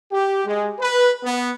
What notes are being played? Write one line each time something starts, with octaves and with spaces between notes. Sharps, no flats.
G4
G#3
B4
B3